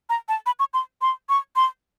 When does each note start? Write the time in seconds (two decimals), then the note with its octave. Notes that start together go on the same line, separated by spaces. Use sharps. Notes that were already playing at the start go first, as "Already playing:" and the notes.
0.09 A#5
0.29 A5
0.46 B5
0.59 C#6
0.74 C6
1.01 C6
1.29 C#6
1.56 C6